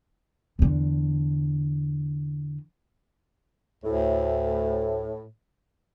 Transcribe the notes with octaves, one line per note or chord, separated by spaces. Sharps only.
E2 D3
D2 A2